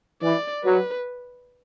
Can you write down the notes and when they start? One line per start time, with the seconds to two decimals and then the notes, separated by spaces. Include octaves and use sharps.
0.22 E3 D5
0.64 F#3 B4